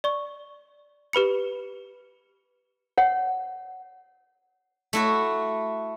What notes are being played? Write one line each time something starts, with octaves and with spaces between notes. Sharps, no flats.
D5 C#6
G4 B4 B5 C#7
C#5 F#5
A3 E4 F#4